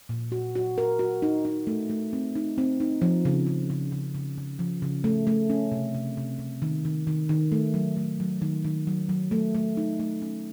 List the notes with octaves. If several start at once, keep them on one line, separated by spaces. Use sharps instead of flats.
A#2
F#4
F#4
A#4
F#4
D#4
D#4
A3
A3
C4
D#4
C4
D#4
F3
C#3
C#3
C#3
C#3
C#3
C#3
F3
C#3
A3
A3
C#4
C3
C3
C3
C3
D#3
D#3
D#3
D#3
A3
F#3
A3
F#3
D#3
D#3
F#3
F#3
A3
A3
D#4
A3
C#4